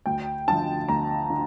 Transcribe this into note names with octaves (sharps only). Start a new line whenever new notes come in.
D2 G5
D3 F3 A5
D2 A#5
D3